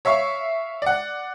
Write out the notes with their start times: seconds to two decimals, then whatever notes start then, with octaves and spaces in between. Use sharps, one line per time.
0.05 C#5 E5 F5 C#6
0.82 D5 F#5